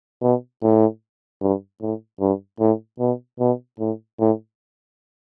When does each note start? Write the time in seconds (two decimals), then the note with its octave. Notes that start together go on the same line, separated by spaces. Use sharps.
0.22 B2
0.62 A2
1.41 G2
1.81 A2
2.20 G2
2.60 A2
2.99 B2
3.39 B2
3.79 A2
4.19 A2